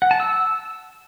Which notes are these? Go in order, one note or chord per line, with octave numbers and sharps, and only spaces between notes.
F#5
A5
E6